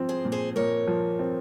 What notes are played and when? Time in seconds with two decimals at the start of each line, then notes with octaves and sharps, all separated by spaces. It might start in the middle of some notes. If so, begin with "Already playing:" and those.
Already playing: F3 C4
0.09 G#4 C5
0.25 A#2
0.32 G#4 C5
0.56 A#2 A#4 C#5
0.87 F3
1.19 C4